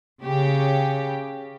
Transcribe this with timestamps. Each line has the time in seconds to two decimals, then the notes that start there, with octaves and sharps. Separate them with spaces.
0.22 C#3 G4